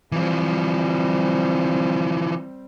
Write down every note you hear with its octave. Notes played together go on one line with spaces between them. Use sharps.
E3 F3 G3 C4